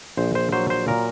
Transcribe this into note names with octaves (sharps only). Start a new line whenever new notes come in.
A#1 C5
C5
F#3 C5
C5
A#2 A#4